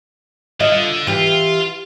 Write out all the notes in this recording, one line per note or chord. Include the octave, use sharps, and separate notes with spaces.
D3 F4 D#5
E3 F4 G4